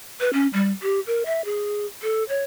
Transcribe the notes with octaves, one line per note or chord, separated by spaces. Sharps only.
B4
C#4
G3
G4
A#4
E5
G#4
A4
C#5